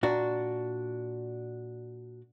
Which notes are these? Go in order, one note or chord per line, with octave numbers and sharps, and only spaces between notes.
A#2 D4 F#4